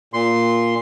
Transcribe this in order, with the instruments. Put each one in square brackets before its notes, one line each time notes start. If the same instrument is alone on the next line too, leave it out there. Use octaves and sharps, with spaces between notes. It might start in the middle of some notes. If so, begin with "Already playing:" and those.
[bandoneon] A#2 C6